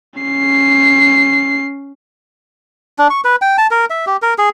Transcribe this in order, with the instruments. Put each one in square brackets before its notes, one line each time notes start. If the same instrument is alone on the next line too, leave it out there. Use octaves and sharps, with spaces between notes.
[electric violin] C#4 C7
[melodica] D4
C#6
B4
G5
A5
A#4
E5
G4
A#4
G#4